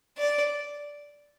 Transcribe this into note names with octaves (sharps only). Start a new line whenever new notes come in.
D5